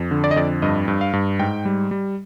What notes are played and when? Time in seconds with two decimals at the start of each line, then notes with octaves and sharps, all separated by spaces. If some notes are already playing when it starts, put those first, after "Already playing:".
Already playing: F2
0.11 D3
0.24 D5
0.31 D#5
0.36 F2 D5
0.62 G2 D#5
0.88 G2
1.01 F5
1.13 G2
1.39 G#2 G5
1.65 G3
1.91 G3